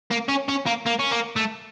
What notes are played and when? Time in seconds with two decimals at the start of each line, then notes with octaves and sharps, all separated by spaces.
0.11 A#3
0.29 C#4
0.48 C#4
0.66 A#3
0.86 A#3
0.99 C#4
1.11 A#3
1.36 A3